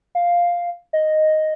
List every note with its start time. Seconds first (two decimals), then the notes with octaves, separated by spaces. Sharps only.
0.15 F5
0.93 D#5